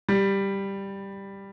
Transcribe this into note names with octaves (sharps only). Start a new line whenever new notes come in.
G3